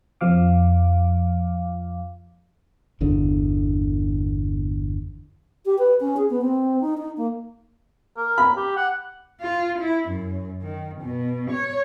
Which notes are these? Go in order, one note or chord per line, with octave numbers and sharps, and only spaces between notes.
F2 F3 F5 D6
G1 E2 D3 D4
G4
B4
C#4
G#4
B3
C4
D#4
D#4
A#3
A#4
B5
G4
F#5
F4
E4
F#2
D#3
B2
C#5